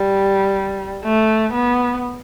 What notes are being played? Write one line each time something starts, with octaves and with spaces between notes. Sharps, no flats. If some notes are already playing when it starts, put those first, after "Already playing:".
Already playing: G3
A3
B3